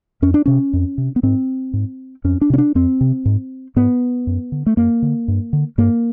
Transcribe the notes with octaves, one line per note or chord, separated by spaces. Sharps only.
F2 C#4
D4
C3 C#4
F2
C3
B3
G#2 C4
G#2
F2 C#4
D4
C3 C#4
D4
F2 C4
C3
G#2
G#2 B3
F#2
D3
A3
F#2 A#3
D3
G2
D3
G2 A#3